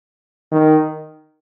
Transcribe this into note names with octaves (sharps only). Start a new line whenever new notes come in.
D#3